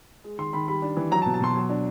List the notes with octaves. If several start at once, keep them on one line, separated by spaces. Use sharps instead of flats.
G#3
D#3 C6
D#3 B5
G3 B5
D4
E3
F#3 A#5
A5
B2
A5
B2 C6
F#3
D4